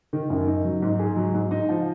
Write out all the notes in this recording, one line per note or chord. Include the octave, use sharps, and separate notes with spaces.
D#3
F#2
D#4
F#3
G#2
G#4
F#3
G#2
D#4
F3